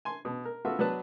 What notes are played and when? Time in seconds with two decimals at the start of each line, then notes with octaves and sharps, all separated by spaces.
0.05 G#5 C6
0.25 B2
0.45 A#4
0.65 B3 F4 F#4 A4 E5
0.79 F#3 B3 D4 B4 A5